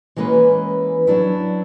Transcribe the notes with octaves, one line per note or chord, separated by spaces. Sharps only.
E3 G#3 A#3 C#4 B4
F#3 D4 E4